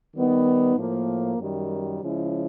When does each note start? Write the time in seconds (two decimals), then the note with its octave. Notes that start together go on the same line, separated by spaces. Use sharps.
0.15 D#3 G3 B3 D#4
0.76 A2 F3 A#3
1.37 F#2 D#3 G3
2.01 C#3 F3 G#3 C#4 E4